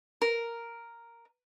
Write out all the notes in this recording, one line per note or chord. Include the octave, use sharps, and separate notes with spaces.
A#4